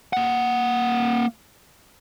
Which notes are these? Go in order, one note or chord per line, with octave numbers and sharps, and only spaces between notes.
A#3 F#5